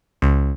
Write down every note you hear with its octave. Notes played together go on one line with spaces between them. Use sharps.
C#2